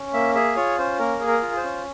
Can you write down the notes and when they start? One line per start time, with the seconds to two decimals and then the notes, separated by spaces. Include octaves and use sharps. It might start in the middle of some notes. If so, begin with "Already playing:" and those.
Already playing: C#4
0.13 A#3 E5
0.35 G#4 E5
0.56 F4 C#5
0.78 C#4 C5
0.99 A#3 A#4
1.20 G#4
1.27 A#4
1.42 F4
1.57 C5
1.63 C#4